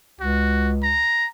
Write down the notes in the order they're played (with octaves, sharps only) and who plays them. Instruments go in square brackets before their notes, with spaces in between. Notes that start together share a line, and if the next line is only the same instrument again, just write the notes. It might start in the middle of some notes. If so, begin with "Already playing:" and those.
[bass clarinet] C#2 [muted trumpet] F#4
[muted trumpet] A#5